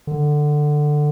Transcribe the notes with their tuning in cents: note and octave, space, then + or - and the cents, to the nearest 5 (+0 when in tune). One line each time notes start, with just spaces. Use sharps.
D3 +15